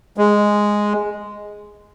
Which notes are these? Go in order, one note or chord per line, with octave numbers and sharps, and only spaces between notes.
G#3